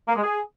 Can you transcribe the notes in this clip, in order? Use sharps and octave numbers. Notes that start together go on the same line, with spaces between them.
A#3
G#3
G#4